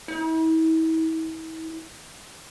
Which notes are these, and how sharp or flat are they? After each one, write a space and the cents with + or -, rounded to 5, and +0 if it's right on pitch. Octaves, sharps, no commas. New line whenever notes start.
E4 -40